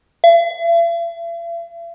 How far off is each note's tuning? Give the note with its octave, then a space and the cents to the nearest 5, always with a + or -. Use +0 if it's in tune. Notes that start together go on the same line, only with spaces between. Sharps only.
E5 +45